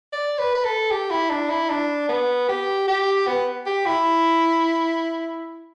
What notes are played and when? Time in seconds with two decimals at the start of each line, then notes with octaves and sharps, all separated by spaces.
0.12 D5
0.39 B4
0.55 B4
0.65 A4
0.91 G4
1.10 E4
1.30 D4
1.50 E4
1.70 D4
2.09 B3
2.49 G4
2.88 G4
3.27 B3
3.66 G4
3.86 E4